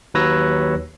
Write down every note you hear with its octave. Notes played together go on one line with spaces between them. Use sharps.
D#2 F#3 B4 C#5 E6 A#6